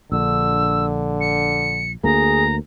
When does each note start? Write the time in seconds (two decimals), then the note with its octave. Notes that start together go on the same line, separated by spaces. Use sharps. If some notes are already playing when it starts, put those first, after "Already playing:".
0.12 A#1 D3 E6
1.21 C#7
2.04 D2 A#3 G#4 A#5